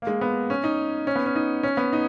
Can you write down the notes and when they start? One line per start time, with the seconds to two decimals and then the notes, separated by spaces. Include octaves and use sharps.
0.02 A#3
0.07 G#3
0.21 B3
0.50 C#4
0.64 D#4
1.07 C#4
1.16 B3
1.26 C#4
1.35 D#4
1.63 C#4
1.77 B3
1.93 D#4